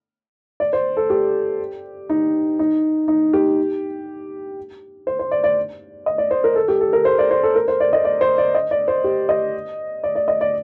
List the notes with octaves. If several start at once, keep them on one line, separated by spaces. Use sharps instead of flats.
D5
C5
A4
G4
D#4
D#4
D#4
G4
C5
C5
D5
D5
D#5
D5
C5
A#4
A4
G4
A4
A#4
C5
D5
C5
A4
A#4
C5
D5
D#5
D5
C5
D5
D#5
D5
C5
G4
D#5
D5
D5
D#5
D5